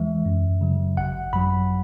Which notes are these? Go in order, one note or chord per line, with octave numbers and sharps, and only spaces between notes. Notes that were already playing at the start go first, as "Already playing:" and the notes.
Already playing: E2 E3 G#3 E5
F#2
C#3 F#3
G#1 F#5
F#2 F#3 B5